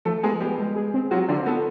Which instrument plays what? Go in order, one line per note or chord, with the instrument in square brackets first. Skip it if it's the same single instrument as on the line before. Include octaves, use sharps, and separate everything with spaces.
[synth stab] F3 [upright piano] A3 A4
[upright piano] G#3 G#4 [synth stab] B3
[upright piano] G3 G4 [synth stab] B3
[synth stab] G#3
G#4
C4
[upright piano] F#3 F#4 [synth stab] F4
[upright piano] D3 D4 [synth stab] F4
[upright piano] C4
[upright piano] B3 [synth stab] A4